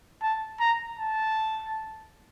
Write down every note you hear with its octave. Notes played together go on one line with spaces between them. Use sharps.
A5
A#5
A5